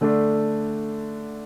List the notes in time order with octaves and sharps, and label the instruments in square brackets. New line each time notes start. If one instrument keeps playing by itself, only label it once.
[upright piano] D3 A3 D4